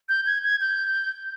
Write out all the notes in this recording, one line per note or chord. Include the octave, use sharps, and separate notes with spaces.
G6
G#6
G#6
G6